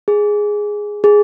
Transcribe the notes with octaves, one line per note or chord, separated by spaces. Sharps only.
G#4
G#4